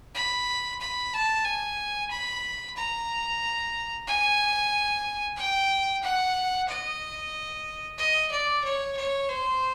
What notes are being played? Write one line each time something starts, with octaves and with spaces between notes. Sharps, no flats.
B5
B5
A5
G#5
B5
A#5
G#5
G5
F#5
D#5
D#5
D5
C#5
C#5
C5